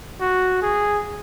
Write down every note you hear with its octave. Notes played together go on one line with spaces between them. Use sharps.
F#4
G#4